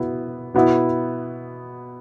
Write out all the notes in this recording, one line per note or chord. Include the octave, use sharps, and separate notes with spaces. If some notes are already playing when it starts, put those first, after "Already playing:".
Already playing: B2 B3 E4
B2 B3 E4